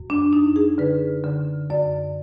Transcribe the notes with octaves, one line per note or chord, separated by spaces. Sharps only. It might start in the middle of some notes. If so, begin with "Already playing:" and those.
Already playing: F#2
D4
F#2 D#4
G#4
D3 B4
D3
F#2 D5